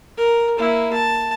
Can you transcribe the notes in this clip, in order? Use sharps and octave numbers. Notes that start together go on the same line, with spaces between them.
A#4
A#3 E4
A5